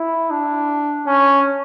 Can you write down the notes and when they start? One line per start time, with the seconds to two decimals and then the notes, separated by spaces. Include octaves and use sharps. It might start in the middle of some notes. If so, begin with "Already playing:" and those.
Already playing: E4
0.31 D4
1.06 C#4